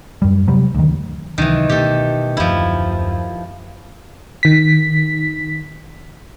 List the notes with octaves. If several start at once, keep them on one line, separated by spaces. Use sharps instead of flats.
F#2 G3
C3 F#3 G3
D2 D#3
C#2 C3 D#3 E3 F#3
B2 A3 G4 A4
D#1 F#2 F3 E4
D#3 B6